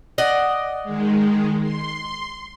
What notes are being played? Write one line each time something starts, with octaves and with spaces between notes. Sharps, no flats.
D5 D#5 F#5
D#3 G#3
C6